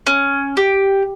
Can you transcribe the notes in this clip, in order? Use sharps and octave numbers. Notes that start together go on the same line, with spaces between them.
C#4
G4